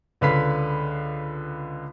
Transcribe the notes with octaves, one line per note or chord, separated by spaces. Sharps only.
C#2 D3 B4 F5 B5 B6